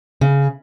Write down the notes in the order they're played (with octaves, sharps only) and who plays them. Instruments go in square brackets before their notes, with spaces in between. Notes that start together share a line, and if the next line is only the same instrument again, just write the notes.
[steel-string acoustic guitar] C#3